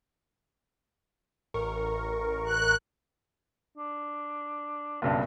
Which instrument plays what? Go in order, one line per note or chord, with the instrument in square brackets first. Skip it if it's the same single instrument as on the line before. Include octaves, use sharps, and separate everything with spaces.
[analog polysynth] A1 A#4 C#6
[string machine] F#6
[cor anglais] D4
[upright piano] F#1 B1 G2 [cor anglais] C4